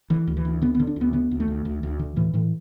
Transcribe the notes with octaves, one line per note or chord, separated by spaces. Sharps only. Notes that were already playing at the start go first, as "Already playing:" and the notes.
D3 E3
D2
E3
D2
D3 B3
B3
D3
D4
D2 B3
D3 B3
D2
A3
D2
D2
D2
D3
A2 E3
A2 E3